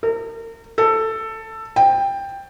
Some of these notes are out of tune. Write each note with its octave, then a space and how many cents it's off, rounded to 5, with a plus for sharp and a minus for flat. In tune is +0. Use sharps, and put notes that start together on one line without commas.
A#4 -35
A4 +10
G5 +10